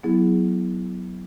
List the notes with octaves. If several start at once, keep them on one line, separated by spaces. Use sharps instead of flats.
F#3 B3 E4 G#4